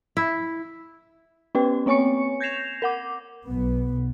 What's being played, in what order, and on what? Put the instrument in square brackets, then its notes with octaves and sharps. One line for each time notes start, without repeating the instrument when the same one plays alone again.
[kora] E4
[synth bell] B3 C#4 G4 B4 G5
A#3 C4 C#5 G#5 C#6 C#7
G6 G#6 A#6 C7 E7 F7
A#4 F#5 D6
[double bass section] B1 B3